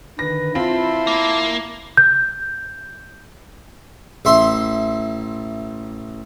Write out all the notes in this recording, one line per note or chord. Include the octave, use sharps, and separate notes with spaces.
D3 D#3 B4 A#6
C4 E4 F4 A5 B5 C6
A#3
G6
A1 E5 C6